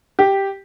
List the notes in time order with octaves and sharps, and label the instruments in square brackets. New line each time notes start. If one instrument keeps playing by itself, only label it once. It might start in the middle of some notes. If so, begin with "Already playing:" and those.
[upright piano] G4